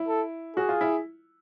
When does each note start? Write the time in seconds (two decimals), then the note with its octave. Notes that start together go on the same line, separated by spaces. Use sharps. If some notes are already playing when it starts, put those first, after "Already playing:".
Already playing: E4
0.08 A4
0.57 F#4 G#4
0.69 F4
0.81 E4